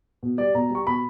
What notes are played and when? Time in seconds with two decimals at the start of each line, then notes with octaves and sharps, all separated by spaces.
0.23 B2
0.38 G3 D5
0.54 B2 A#5
0.70 G3 C#6
0.87 B2 B5